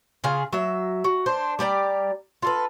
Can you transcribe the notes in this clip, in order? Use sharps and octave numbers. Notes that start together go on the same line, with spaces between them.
C#3 F4 G#4 F5
F#3 E5
F#4
D4 C5
G3 G4 D5 A#5
F4 A4 B4